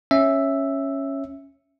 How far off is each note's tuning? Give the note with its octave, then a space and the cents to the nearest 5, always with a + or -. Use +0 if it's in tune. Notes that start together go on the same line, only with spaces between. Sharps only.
C#4 -10 E5 +0